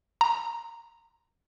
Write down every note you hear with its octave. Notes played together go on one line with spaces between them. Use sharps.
A#5